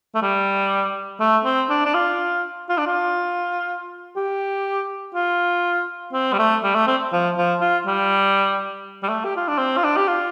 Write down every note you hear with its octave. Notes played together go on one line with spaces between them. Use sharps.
A3
G3
A3
C4
D4
D4
F4
F4
D4
F4
G4
F4
C4
G3
A3
G3
A3
C4
F3
F3
F4
G3
G3
A3
G4
F4
D4
C4
F4
D4
G4
F4